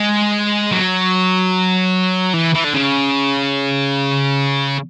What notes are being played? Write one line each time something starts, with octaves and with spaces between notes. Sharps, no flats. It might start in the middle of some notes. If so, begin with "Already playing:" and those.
Already playing: G#3
F#3
E3
E3
D3
C#3